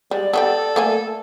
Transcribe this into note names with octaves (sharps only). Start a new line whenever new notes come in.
G3 G#3 D5
B3 F#4 G4 A4
A3 A#3 G#5